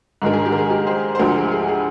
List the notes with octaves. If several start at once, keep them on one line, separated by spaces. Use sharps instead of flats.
G#2 D#3 G#3 D4 A#4
G#4
G4
A#4
G#4
G4 A#4
G#4 C5
C5
D2 D3 F3 G#3 G4 A#4
G#4
G#4
G#4